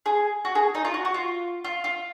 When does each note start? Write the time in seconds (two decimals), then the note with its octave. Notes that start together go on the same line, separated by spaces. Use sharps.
0.06 G#4
0.45 F#4
0.55 G#4
0.75 D#4
0.85 F4
0.94 F#4
1.05 F#4
1.14 F4
1.65 F4
1.84 F4